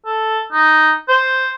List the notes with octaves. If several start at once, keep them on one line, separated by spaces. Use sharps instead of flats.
A4
D#4
C5